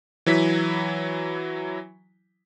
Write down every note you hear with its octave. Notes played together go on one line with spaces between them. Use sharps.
E3 F#3 E4 B6